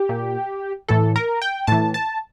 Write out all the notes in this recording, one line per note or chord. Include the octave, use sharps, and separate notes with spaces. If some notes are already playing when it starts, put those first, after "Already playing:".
Already playing: G4
A#2
A2 E3 A4
A#4
G5
A2 E3 A5
A5